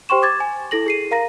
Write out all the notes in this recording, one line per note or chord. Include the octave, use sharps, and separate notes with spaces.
G4 C5 G5 C6 C#6 E7
D6 G#6 A6
G#5
E4 A4 A#6 F#7
G#4 C7 D#7
A#4 F5 A#5 A#6